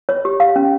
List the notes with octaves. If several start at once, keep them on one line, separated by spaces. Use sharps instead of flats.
C#5
G4
F5
C#4